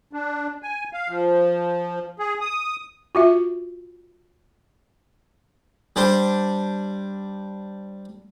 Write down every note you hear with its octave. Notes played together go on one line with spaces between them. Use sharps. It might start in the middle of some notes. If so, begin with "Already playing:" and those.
D4
G#5
F5
F3
G#4
D#6
F4 F#4 E5
G3 D4 C5